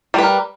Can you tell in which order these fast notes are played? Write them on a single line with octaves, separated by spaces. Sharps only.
G3 B4 A#4